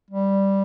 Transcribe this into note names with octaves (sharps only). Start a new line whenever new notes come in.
G3